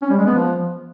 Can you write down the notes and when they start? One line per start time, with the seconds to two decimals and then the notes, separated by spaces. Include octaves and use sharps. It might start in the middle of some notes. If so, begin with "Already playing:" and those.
0.02 C#4
0.10 G3
0.18 G#3
0.26 B3
0.34 F3